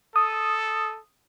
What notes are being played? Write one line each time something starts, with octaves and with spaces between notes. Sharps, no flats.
A4 D#6